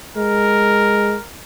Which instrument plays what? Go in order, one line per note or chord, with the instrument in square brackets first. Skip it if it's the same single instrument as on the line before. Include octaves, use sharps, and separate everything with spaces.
[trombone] G#3 [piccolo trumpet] A#4